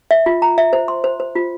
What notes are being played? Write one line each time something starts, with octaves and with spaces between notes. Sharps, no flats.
E5
F4
A#5
E5
C5
C6
C5
C5
F4